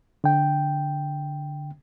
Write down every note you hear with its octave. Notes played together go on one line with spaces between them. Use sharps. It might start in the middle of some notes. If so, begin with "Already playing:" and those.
D3 G5